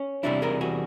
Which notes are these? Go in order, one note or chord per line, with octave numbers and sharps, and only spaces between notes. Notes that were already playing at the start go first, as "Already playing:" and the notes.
Already playing: C#4
E2 C3 E3 G3 D4 E4
G#4 A#4
F#4 G#4